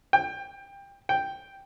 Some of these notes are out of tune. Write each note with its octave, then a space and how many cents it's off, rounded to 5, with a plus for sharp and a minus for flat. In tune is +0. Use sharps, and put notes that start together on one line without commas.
G5 +20
G5 +0